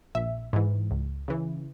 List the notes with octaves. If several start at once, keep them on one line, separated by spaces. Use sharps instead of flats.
A#1 E5
G#2 E3
C#2
C#3 E3